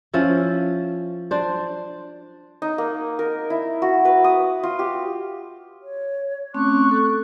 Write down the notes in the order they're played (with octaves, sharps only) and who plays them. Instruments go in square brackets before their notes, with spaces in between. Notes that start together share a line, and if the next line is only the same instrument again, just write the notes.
[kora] F3 C#4 E4
D4 C5
[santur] D#4
A#3
A#4
E4
F#4
B4
D#6
F4
G4
[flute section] C#5
[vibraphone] A3 C4 C#4 [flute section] C#6 D6 F#6
[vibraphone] A4